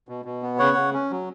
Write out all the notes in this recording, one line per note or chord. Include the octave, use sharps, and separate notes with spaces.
B2
B2
B3
C#3 C#5 F#5
C#3
C#4
F#3